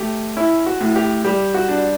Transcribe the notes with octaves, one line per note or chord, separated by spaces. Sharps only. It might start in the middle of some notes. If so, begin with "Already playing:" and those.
Already playing: A3 G4
C#4 E4
F#4
A2
G4
G3 G4
F#4
D4